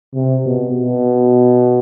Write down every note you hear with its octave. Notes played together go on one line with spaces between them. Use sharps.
C3
B2
B2